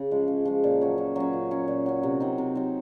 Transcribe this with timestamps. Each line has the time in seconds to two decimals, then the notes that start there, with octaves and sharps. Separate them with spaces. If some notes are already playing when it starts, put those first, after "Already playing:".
Already playing: C#3
0.11 F3 G#3
0.28 C#3
0.45 F3 G#3
0.64 A#2
0.81 F#3 C#4
0.98 A#2
1.16 F#3 C#4
1.33 A#2
1.51 F#3 C#4
1.68 A#2
1.86 F#3 C#4
2.03 C3
2.20 F#3 C4 D#4
2.38 C3
2.55 F#3 C4 D#4